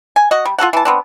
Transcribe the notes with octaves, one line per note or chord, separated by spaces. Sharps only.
G#5
F#4 D#5
G3
F4 F#4 A4 F#5
E3 A5
B3 C4 D4